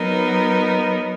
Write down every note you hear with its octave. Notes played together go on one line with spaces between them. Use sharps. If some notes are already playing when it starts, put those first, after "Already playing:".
Already playing: F#3 B3 D#4 A#4